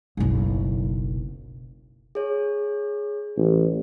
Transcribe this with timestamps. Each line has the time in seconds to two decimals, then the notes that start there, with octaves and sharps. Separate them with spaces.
0.17 F#1 B1
2.15 G#4 C#5
3.37 A1